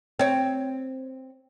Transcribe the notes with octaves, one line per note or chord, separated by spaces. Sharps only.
C4 C#5